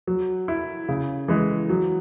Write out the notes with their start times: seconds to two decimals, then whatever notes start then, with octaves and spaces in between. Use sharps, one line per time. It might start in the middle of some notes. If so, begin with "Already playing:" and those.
0.07 F#3
0.48 E4
0.89 C#3
1.28 E3 G#3
1.69 F#3